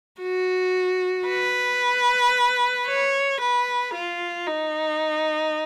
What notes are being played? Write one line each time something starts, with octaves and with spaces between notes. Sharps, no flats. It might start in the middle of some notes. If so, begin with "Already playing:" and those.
F#4
B4
C#5
B4
F4
D#4